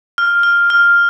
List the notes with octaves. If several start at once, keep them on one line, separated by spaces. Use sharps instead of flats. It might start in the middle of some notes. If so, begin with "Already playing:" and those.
F6
F6
F6